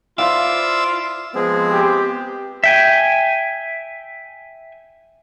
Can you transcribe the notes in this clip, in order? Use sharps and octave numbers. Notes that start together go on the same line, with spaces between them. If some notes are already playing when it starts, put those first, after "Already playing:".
E4 F4 B4 C5 D5 E5 F5 E6
F3 G#3 B3 C4 G#4
G4
E5 G5 G#5